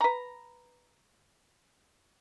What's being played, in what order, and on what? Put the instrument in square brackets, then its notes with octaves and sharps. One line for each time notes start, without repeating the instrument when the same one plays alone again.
[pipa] B4 A#5